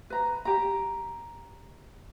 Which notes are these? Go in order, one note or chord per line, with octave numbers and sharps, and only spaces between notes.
B4 A#5
G4 A#5